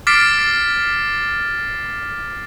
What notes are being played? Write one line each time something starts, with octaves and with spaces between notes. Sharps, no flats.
D6 F6 A6 B6 C7 D7